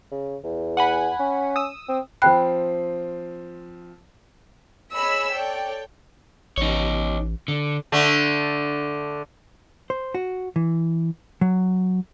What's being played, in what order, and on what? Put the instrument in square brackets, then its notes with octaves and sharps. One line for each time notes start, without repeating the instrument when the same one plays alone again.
[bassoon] C#3
E2
[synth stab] F#5 G#5 B5
[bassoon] C#4
[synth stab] D#6 E6
[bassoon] C4
[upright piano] F3 C4 C7 [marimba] G5 B5 F#6
[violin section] G#4 C#5 D#5 B5 E6 B6
A4 C#5 D5 G5
[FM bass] A1 [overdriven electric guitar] D#4 C#5
[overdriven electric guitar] D3
[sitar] D3 A3
[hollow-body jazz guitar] C5
F#4
E3
F#3